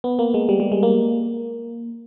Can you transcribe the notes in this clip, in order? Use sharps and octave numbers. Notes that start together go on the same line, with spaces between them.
B3
A#3
G#3
G3
G3
G#3
A#3